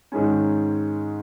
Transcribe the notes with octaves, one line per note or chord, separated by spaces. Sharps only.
G#2 D#3 G#3 C#4